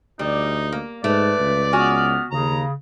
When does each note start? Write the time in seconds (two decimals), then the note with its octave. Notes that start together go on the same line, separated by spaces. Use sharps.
0.19 D2 G3 D#4
0.72 A#3
1.04 G#2 A3 B4 D5
1.40 C#2
1.73 B3 F#4 G#5 F6
2.31 D#2 C#3 A#5